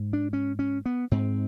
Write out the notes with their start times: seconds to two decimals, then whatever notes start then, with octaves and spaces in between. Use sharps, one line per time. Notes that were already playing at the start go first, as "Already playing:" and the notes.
Already playing: G#2
0.13 D4
0.33 C#4
0.59 C#4
0.86 B3
1.11 G#2 C4